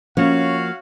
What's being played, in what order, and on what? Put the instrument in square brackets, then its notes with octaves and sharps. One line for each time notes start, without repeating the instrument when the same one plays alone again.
[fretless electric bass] F3 A#3 [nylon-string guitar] C#4 [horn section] F#4 C#5 F5